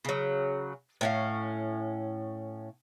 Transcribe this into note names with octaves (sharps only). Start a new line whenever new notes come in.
C#3 F#3
A2 C#4 F5